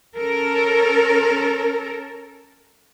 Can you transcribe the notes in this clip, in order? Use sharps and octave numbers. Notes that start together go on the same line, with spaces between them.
C#4 A4 A#4